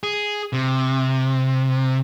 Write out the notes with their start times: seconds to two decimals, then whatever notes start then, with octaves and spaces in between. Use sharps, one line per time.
0.03 G#4
0.53 C3